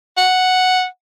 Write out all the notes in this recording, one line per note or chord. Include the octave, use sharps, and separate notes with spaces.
F#5